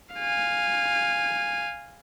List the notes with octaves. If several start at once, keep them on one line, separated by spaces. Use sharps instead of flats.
F5 G#5